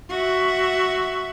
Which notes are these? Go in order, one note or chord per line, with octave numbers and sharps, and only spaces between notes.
F#4 E5